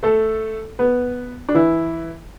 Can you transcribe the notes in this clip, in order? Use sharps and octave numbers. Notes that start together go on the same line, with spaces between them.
A3 A4
B3 B4
D4
E3 E4